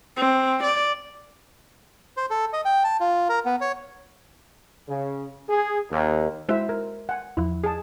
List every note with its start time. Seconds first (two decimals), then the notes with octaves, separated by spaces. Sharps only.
0.17 C4
0.63 D5
2.17 C5
2.30 A4
2.53 D#5
2.65 G5
2.84 A5
3.00 F4
3.29 A#4
3.45 B3
3.61 C#5
4.88 C#3
5.49 G#4
5.90 D#2
6.49 G#3 E4 F#4 C5 E5
6.69 A#4
7.09 F#5 G#5
7.37 E2 F3 E4
7.64 G#4 A5